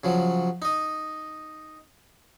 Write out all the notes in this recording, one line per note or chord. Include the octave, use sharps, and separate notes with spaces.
C#3 F3 F#3
D#4 D#5